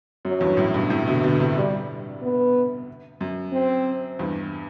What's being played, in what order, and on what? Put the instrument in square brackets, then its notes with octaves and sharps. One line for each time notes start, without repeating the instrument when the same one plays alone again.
[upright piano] F#2 [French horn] F#3
[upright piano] E2 G2
F#2 A2
G2 B2
A2 C3
B2 D3
B2 D3
A2 C3
[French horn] G3
B3
[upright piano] F#2
[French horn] C4
[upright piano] E2 G2